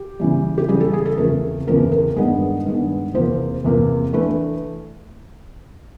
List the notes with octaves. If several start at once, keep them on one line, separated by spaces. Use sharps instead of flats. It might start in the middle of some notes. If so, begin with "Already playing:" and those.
Already playing: G4
C#3 E3 G3
G4
C#3 E3 G3 G#4
A4
G#4
A4
E2 C#3 F3 A3 C4 A#4
E2 C#3 F3 A3 C4 A#4
A#4
G2 D#3 G#3 B3 D4 G#4
G2 D#3 G#3 B3 D4
E2 C3 F3 A#3 C5
E2 C3 F3 A#3
E3 A3 D4 B4